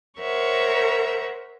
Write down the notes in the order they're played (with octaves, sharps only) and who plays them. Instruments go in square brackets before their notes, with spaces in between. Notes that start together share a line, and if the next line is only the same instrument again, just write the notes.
[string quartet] A#4 C5 C#5 E5 F#5